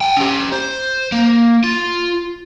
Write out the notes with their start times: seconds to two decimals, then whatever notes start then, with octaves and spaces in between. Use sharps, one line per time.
0.01 F#5 G5
0.17 C#4 G4
0.52 C5
1.12 A#3
1.64 F4